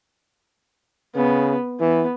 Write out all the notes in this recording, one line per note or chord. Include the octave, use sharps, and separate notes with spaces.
C#3 B3
E3 B3